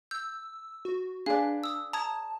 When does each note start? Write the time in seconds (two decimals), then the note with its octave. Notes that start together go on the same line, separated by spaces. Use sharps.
0.11 E6 G6
0.85 F#4
1.26 D4 G#4 B4 D5 F5
1.64 D#6 E6
1.93 A5 A#5 D#6 G#6